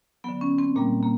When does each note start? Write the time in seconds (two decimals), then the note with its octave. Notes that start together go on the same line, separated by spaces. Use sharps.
0.24 D3 F#3 B3
0.41 C#4
0.58 C4
0.76 A#2 G3 A#3
1.03 A#3